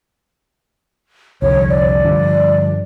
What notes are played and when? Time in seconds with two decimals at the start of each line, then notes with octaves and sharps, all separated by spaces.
1.42 C2 F2 D3 C#5
1.69 D5
2.05 G2 D3 F3